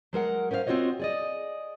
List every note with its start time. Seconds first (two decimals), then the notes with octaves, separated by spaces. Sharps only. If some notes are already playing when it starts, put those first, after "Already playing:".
0.13 F#3 G#3 A#4 F#5
0.51 C#4 A#4 C5 D5 F5
0.67 C4 F4 F#4 C#5 D#5
0.99 G#4 D5 D#5